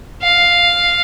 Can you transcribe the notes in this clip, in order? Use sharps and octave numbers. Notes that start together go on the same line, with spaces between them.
F5